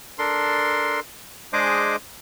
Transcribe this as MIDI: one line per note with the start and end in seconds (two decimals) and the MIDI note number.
0.19 1.00 62
0.19 1.00 69
0.19 1.00 70
0.19 1.00 84
1.53 1.96 56
1.53 1.96 62
1.53 1.96 68
1.53 1.96 72
1.53 1.96 75
1.53 1.96 86